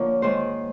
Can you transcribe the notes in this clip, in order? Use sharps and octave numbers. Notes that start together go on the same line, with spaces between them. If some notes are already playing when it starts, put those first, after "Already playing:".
Already playing: D3 F3 A#3 C#5
G#2 D#3 G#3 C5